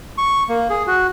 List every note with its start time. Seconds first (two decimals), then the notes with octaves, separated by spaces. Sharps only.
0.18 C#6
0.49 A#3
0.70 G#4
0.87 F#4